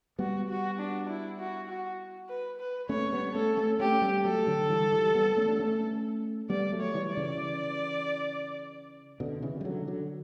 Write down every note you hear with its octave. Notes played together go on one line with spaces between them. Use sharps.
G3 B3 F#4
F#4
D4
E4
F#4
F#4
B4
B4
A3 C#4 C#5
G3 B3
A3 C#4 A4
A3 C#4
A3 C#4 G4
G3 B3
F#3 A3 A4
D3 F#3
E3 G3
E3 G3
G3 B3
A3 C#4
D4
A3 C#4
G3 B3 D5
F#3 A3
C#5
E3 G3
D5
C#3 E3
B2 D3
C#3 E3
G3
D3 F#3
D3 F#3